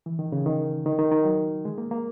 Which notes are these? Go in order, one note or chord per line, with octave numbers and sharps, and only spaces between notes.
E3
D#3
C#3
D#3
D#3
D#3
D#3
F#3
G#3
A#3
A#3